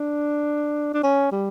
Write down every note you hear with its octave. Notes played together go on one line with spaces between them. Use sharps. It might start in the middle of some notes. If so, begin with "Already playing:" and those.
Already playing: D4
D4
C#4
G3